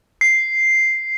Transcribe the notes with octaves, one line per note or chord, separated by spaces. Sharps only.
C7